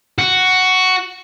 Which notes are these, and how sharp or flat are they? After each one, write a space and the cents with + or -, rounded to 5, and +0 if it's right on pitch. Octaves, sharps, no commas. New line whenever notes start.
F#4 +5